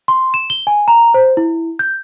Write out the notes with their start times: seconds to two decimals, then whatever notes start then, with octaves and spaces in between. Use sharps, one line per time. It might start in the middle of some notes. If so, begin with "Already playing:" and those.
0.08 C6
0.34 E7
0.50 G7
0.67 G#5
0.88 A#5
1.14 C5
1.37 E4
1.79 G6